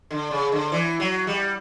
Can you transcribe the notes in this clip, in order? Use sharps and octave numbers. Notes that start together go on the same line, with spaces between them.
D3
C#3
D3
E3
F#3
G3